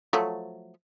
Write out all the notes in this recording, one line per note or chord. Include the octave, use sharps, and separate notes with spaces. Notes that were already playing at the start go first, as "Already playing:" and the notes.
F3 F#3 A3